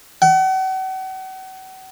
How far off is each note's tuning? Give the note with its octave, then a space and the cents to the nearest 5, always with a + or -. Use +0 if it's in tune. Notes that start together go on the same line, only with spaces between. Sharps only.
F#5 +40